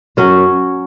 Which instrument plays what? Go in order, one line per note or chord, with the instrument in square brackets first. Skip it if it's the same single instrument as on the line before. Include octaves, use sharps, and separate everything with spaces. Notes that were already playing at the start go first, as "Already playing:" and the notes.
[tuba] F#2 [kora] F#3 C#4 F#4